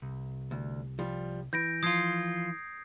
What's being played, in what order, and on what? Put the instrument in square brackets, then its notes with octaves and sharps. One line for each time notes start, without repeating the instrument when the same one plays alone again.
[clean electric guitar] C2
[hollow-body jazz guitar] D2
F3 G3
[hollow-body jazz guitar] E3 [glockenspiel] G6 A#6 D7
[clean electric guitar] F3 F4 [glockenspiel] D#6 G#6 C7